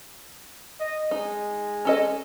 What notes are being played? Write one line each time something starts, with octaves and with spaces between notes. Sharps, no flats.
D#5
G#3 D#4
C#4 A4 D#5